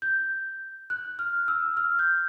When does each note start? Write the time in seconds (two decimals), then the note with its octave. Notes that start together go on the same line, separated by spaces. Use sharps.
0.02 G6
0.90 F#6
1.19 F6
1.48 E6
1.77 F6
1.99 G6